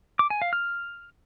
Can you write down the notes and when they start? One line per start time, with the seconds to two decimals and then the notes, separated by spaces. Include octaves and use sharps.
0.19 D6
0.30 G#5
0.42 F5
0.53 F6